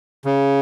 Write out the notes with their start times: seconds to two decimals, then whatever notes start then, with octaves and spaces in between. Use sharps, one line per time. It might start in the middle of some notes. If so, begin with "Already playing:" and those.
0.25 C#3